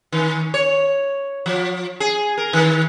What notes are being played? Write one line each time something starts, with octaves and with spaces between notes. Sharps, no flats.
D#3
C#5
F3
G#4
A#4
D#3